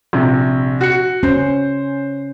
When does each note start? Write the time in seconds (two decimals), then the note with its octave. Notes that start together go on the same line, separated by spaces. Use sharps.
0.13 A#1 C3
0.81 F#4 C#7
1.23 C#4 C5